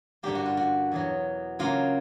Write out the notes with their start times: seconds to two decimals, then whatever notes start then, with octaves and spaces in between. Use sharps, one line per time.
0.23 G2 D3 G3 A#3 G4
0.35 F#4
0.46 F4
0.57 F#4
0.92 E2 B2 F#3
1.59 C#3 F#3 A#3 F4